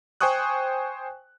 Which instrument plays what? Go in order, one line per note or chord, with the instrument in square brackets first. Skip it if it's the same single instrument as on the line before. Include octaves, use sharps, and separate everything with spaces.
[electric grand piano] C5 G5 G#5 C#6 D#6 F#6